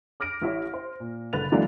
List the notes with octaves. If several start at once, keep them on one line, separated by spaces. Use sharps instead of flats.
D6 F6 A#6 D7
A1 E4 C#5
C5
A#2
F#1 D3 B4 A6 F7
D3 E3 F#3 G#3 A#3 D4